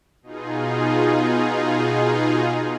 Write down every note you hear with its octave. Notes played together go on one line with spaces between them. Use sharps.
B2 D#4 F4 G#4